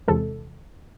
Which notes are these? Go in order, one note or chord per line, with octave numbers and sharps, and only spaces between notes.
E2 C3 E3 G#3 A4